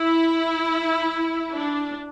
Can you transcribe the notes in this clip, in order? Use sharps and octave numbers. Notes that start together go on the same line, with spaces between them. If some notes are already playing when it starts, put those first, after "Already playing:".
Already playing: E4
D4